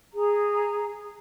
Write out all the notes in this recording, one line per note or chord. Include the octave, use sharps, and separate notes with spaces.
G#4 A#5